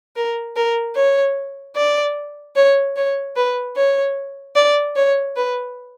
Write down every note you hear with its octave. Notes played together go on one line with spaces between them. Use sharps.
A#4
A#4
C#5
D5
C#5
C#5
B4
C#5
D5
C#5
B4